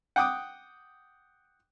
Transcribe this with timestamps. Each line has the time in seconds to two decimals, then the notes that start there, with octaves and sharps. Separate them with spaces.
0.16 F#5 G5 D6 D#6